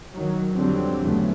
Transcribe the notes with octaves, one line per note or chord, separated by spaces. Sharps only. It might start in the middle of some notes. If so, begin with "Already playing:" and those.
D#3 F#3
F2 D3 F#3 G3 C4
E2 G2 C#3 F#3 A3